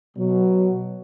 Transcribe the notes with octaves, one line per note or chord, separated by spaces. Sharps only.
B2 F#3